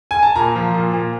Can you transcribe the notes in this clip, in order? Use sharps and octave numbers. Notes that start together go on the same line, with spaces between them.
G#5
A5
A#2 A#5
F3
A#2
A#2